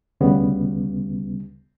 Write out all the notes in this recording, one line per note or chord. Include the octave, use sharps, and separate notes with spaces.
D2 C#3 G3 B3